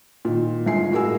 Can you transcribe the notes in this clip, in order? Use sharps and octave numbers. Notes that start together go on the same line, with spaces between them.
A#2 D#3
G1 G#2 F4 G#5 C7
A2 F#4 G#4 A#4 G#5 E6